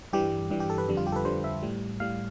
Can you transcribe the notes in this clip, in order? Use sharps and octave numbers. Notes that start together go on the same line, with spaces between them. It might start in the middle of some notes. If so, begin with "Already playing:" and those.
G2 E3 G3 G4
G2 E3 G3
G4
A4
B4
F2 D3 G3
F4
G4
A4
B4
F2 D3 G3 C5
E5
A2 G3
A2 G3 F5